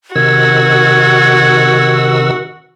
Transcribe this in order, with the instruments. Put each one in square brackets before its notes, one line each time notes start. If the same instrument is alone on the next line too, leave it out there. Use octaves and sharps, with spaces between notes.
[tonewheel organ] C3 D#3 E6 [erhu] F#4 [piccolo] G#6